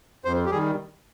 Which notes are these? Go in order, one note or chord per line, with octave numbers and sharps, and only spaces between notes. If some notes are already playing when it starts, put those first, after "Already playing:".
F2 C5
G4
D#3 G3 G#4